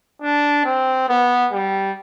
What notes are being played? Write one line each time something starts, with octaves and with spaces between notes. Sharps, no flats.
D4
C4
B3
G3